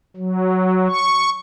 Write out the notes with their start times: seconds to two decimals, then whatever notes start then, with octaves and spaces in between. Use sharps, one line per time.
0.17 F#3
0.89 C#6